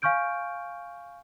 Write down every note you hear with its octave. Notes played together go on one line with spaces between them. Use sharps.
F5 G#5 C#6 F6 G6 D7